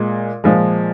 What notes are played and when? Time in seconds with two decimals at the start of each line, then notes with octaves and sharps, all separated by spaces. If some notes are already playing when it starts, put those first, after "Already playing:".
Already playing: A#2 G#3
0.44 A#2 F3 G#3